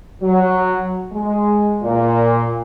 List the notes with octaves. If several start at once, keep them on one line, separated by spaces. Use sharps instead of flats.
F#3
G#3
A#2